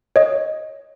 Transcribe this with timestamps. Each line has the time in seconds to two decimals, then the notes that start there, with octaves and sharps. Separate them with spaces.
0.16 C#5 D#5